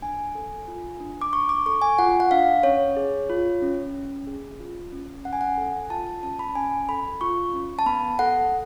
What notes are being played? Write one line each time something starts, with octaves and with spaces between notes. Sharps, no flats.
D4 G#5
A4
F4
D4
D6
D4 C#6
D6
A4 C#6
G#5
F4 F#5
F#5
D4 F5
C#4 C#5
G#4
F4
C#4
C#4
G#4
F4
C#4
C#4 F#5
G#5
F#5
A4 G#5
F4 A5
A5
C#4 A5
B5
C#4 G#5
A4 B5
F4 C#6
C#4
A5
B3 B5
A4 F#5